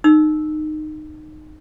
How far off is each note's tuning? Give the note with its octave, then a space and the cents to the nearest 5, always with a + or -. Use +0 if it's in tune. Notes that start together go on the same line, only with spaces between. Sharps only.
D#4 -20 E6 -5